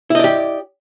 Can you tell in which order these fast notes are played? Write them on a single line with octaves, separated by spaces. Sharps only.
E4 D#5 D5 G4